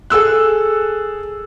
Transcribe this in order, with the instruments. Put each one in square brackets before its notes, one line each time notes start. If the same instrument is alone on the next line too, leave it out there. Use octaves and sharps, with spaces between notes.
[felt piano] G#4 A4 E6 F#6